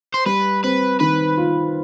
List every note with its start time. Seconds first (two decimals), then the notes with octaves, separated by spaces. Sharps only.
0.14 C5
0.26 G3 B4
0.64 C4 B4
1.00 D#3 B4
1.38 F4